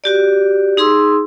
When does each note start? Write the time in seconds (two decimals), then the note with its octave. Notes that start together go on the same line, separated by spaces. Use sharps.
0.04 F#4 G4 D5
0.77 D#4 G#4 C6 E6